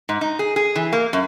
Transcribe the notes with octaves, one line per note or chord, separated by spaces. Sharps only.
G#2
D#4
G#4
G#4
E3
A#3
F#2